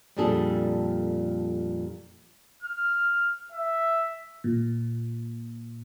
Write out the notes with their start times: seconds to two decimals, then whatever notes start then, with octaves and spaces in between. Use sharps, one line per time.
0.17 F2 A#2 G3 D4 G#4 A4
2.63 F6
3.52 E5
4.44 A#2